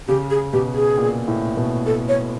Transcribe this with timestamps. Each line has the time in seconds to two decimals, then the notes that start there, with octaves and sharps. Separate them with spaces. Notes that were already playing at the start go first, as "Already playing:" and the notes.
0.08 C#3 G4
0.30 G#4
0.53 B2 G4
0.75 G#4
0.98 A#2
1.28 A2
1.57 B2
1.86 A4
2.09 C#5